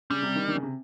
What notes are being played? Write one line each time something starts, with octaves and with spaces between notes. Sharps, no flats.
C#3 G3
C3
D#3
D#3
C#3
C3